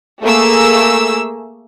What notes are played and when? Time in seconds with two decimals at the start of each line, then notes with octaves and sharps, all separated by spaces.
0.22 A3 A#3 G#4 E6